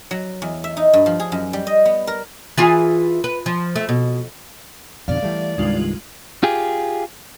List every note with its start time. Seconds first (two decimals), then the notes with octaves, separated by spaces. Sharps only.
0.11 F#3
0.42 E2
0.64 E5
0.77 D#4
0.93 G2
1.06 F3
1.20 G#4
1.32 F#2
1.53 G3
1.67 D#5
1.85 B3
2.07 A#4
2.58 E3 F4 G#4
3.24 B4
3.46 F3
3.76 A3
3.89 B2
5.08 F2 B2 D3 D5 F5
5.23 E3 G3 A3
5.58 C2 G2 D#3 G#3 F4 F#7
6.43 F4 G4 G#4